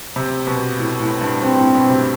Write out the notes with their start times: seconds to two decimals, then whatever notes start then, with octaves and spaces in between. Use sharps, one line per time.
0.16 C3
0.47 B2
0.79 A2
1.00 A2
1.21 G2
1.42 G2 C4
1.59 A2
1.75 B2
1.90 C3